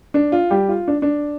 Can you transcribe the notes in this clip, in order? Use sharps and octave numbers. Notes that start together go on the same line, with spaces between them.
D4
F4
G3 G4
F4
D4
D4